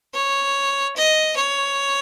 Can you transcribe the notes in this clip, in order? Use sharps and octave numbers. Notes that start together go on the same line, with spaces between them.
C#5
D#5
C#5